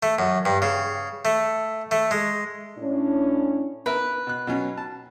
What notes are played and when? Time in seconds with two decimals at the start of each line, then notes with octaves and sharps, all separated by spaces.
0.03 A3
0.19 F#2
0.45 G2
0.62 C#3
1.25 A3
1.91 A3
2.11 G#3
2.78 A2 C#4 D4
3.86 B3 A#4 B4 E5
4.27 B2 F#6
4.47 B2 F#3 C#4
4.78 A5